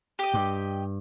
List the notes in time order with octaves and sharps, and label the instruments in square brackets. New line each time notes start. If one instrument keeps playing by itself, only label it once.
[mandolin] G4 D#5
[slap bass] G2